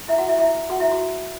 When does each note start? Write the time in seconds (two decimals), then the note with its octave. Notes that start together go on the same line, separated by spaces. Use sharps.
0.08 E4 E5
0.18 F#4 F#5
0.28 E4 E5
0.39 E4 E5
0.70 F#4 F#5
0.80 E4 E5
0.91 F#4